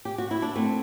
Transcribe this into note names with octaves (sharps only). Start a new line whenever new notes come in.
G4
F#4
E4
D4
A3 C4